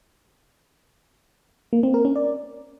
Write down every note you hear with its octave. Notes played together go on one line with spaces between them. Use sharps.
A#3
C4
A#4
C#4
D5